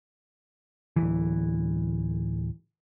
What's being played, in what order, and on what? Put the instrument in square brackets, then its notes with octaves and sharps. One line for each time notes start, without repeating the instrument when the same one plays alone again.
[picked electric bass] D1 A#1 E3